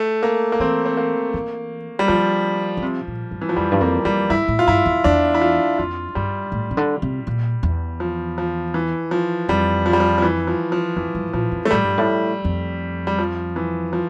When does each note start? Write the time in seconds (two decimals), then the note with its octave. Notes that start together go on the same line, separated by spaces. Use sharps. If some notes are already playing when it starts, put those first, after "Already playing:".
Already playing: A3
0.23 A#3
0.52 A#3
0.60 E3 C4
0.85 C4
0.97 A#3
1.34 E3
1.99 G3
2.08 D3 F3
2.77 D3
2.82 C3
3.08 A#2
3.31 G2
3.41 E3
3.49 F3
3.56 F2 G3
3.72 G2
3.81 F2 A#3
4.05 F2 G3
4.30 G2 E4
4.48 A2
4.59 F4
4.68 G2 E4
4.86 E2
5.04 E2 D4
5.34 E4
5.41 F4
5.78 F2 F4
6.15 G2 G3
6.52 A2
6.71 C3
6.77 D3
7.02 C3
7.27 A#2
7.63 E2
8.00 F3
8.38 F3
8.74 E3
9.11 F3
9.49 F2 G3
9.86 F3
9.93 G3
10.00 F3
10.18 F3
10.22 E3
10.47 F3
10.72 F3
10.96 F2 E3
11.15 G2
11.33 A#2 F3
11.52 F2
11.65 A3
11.71 A2 G3
11.84 G2
11.98 A2
12.45 F2
13.07 G3
13.19 F3
13.56 E3
13.93 F3